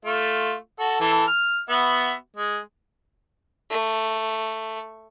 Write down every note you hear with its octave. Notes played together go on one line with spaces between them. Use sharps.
A3 F4
F#4 A4
E3 A4
F6
B3 F#4 E5
G#3
A3